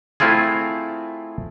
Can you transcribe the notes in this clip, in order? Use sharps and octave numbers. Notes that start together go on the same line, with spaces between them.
A3 C4 E4 F4 G#4